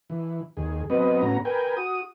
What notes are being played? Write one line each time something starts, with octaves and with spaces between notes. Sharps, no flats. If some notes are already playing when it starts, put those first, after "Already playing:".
E3
D#2 G#4
F#3 B3 C4 B4 D#5
A2 B3 C#4 F#4 A#5
A#4 B4 G5 G#5
F#4 D#6